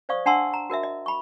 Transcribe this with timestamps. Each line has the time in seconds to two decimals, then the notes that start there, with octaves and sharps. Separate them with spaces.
0.09 C5 D5 F5 C#6 D#6
0.26 D4 F#5 A5 C6 E6
0.54 A#5
0.70 F#4 A#4 D#5 E5
0.83 D#5
1.06 B5 C#6